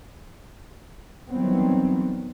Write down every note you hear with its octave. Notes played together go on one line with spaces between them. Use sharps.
D#3 E3 F#3 G3 B3 C4